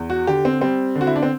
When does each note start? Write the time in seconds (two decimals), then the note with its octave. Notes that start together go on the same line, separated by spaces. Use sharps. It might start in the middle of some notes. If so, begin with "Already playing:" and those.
Already playing: E2
0.10 F#4
0.27 D3 G4
0.45 C4
0.61 G3 C4
0.95 D3
1.01 F#4
1.07 E4
1.16 D4
1.23 C4